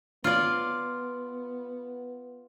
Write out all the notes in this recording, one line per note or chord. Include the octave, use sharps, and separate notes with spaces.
B3 F4 D5